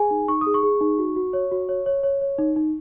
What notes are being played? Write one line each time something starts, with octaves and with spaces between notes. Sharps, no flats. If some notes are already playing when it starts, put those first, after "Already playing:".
Already playing: G#4 G#5
D#4
D#4 C#6
G#4 D#6
C#6
G#4
D#4
F#4
F#4
C#5
F#4
C#5
C#5
C#5
C#5
D#4
D#4